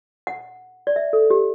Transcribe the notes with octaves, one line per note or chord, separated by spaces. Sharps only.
F#5
D5
E5
A4
G4